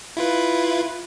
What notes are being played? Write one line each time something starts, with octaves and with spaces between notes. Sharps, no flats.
E4 F4 B4